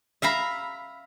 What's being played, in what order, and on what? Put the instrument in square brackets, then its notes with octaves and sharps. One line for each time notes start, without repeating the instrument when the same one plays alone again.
[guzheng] E5 F5 A#5 B5